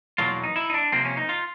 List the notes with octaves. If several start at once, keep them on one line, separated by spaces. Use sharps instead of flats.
E2 B2 F#3 A#3 F4
D#4
E4
D#4
D4
C3 F3 A#3 C4
C#4
D#4
F4